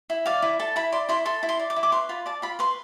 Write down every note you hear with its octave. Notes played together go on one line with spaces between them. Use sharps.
E4
D5 F5
E4
A4 A5
E4 B5
D5 C6
E4 C6
A4 C6
E4
C6
D5
D6
E4
D6
B4 C6
F4 B5
D5 A5
F4 B5
B4 C6